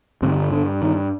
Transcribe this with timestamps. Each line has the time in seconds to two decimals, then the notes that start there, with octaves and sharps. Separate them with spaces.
0.22 G2 D3 C4
0.52 D3
0.82 D#3